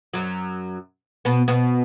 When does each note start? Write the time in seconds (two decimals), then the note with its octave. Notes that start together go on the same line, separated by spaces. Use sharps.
0.14 F#2 F#3
1.25 B2 B3
1.48 B2 B3